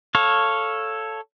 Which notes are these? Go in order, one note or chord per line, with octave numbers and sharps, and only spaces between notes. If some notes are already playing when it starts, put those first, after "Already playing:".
A4 C#5 F5